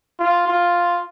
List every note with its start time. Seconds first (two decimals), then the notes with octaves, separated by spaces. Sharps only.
0.19 F4
0.48 F4